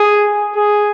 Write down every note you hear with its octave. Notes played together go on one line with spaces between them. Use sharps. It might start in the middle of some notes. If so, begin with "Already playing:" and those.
Already playing: G#4
G#4